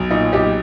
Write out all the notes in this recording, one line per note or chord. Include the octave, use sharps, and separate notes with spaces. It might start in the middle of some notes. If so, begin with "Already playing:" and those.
Already playing: B1
A#2 D#4
B1 D#4 G4